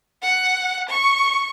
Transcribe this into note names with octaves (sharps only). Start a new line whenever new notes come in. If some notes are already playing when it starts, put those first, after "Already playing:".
F#5
C#6